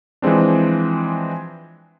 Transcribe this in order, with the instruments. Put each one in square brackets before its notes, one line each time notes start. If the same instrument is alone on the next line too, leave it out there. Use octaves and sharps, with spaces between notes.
[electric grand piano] E3 F3 G#3 C4 D4